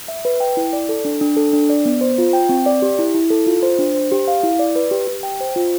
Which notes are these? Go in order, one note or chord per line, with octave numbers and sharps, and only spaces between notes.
E5
B4
G5
E4
D5
A4
D4
D4
A4
D4
D5
B3
C5
F4
G5
C4
D5
G4
E4
E4
A4
F4
C5
D4
C5
G4
F5
E4
D5
B4
G4
G4
G5
C5
F4